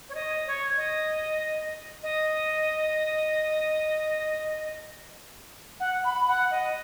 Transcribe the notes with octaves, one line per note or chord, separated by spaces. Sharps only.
C#5
D#5
C#5
D#5
D#5
F#5
B5
F#5
D#5